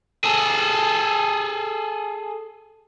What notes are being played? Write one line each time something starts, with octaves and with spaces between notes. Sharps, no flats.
G#4 A4